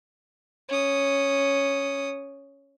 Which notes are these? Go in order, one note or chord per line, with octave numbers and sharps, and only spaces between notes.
C#4 D#6